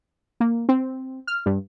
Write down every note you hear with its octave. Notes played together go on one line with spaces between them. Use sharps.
A#3
C4
F6
G2